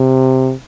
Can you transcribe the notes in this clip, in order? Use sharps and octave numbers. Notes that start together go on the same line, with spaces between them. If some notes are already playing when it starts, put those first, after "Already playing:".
Already playing: C3